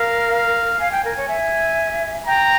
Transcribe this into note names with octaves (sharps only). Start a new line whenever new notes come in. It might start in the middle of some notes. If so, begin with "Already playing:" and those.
Already playing: A#4 F5
F5
F5 G#5
G5
A#4
C#5
E5 G#5
G5 A#5